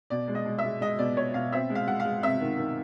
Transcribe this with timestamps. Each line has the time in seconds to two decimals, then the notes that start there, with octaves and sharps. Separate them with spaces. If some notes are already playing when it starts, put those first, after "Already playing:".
0.10 B2 D5
0.28 G#3
0.35 D#5
0.46 G#3
0.58 E5
0.64 G#3
0.81 G#3 D#5
0.99 B2 D5
1.16 B2 C#5
1.34 B2 F5
1.52 C4 E5
1.70 G#3
1.75 F5
1.88 G#3 F#5
2.00 F5
2.05 G#3
2.23 C3 E5
2.41 D#3
2.58 D#3